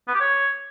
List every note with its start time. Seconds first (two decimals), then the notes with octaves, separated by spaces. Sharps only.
0.08 B3
0.14 G4
0.20 C#5